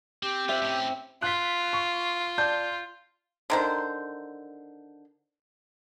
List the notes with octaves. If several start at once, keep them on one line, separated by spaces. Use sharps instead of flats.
C4 G4
C4 F4 E5 F#5
A2 C#4
F4 F#6 B6
C#6
D5 A5 G6
D3 D#3 C5